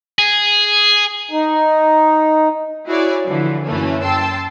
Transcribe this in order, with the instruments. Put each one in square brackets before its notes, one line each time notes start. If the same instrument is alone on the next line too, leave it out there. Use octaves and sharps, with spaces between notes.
[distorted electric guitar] G#4
[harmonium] D#4
[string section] E4 F#4 G#4 C#5 D5
D3 E3 F3
F#2 E3 A3 A#3 C#4
G5 A5 C6 E6